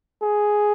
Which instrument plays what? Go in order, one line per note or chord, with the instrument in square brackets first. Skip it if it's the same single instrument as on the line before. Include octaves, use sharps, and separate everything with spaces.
[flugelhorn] G#4